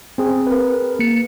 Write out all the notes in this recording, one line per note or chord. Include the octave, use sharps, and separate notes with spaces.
C4 G#4
A#4 B4
A#3 C#7